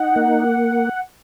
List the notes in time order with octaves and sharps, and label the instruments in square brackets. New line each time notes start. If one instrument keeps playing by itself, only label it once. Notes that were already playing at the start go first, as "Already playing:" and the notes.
Already playing: [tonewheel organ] D#4 [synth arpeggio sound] F#5
[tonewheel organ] A#3